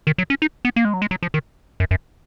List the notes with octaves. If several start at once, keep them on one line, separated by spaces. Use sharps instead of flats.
D#3
F#3
C#4
D#4
B3
A#3
G#3
F#3
G#3
F#3
F3
D#3
F#2
F#2